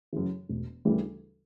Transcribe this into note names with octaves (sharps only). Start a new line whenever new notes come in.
F#2 C#3 E3
E1
D2 C#3 E3 G3